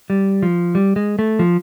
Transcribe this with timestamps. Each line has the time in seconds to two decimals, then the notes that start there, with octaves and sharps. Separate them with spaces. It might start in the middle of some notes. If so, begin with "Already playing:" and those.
0.10 G3
0.43 F3
0.75 G3
0.96 G#3
1.19 A3
1.39 F3